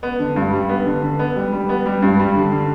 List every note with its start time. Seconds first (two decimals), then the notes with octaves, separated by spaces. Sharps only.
0.03 B3
0.19 D3
0.36 G2
0.52 G3
0.69 B3
0.86 D3
1.03 D3
1.19 B3
1.36 G3
1.52 G3
1.69 B3
1.86 G3
2.02 G2
2.19 G3
2.36 D3
2.52 D3